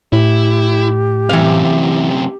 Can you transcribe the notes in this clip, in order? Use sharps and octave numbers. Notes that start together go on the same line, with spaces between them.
A2 E4 G4
F#2 C3 E3 F5